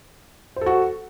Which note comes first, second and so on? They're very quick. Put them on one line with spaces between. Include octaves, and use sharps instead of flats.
C5 A4 F#4